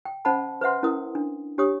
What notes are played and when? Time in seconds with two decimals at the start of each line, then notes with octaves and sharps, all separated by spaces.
0.05 G5
0.25 C#4 C5 D#5 F#5 A5 B5
0.61 B4 C5 E5 F#5 C6
0.83 C#4 E4 A#4 D#6
1.15 D4
1.58 D4 G4 C#5 D#6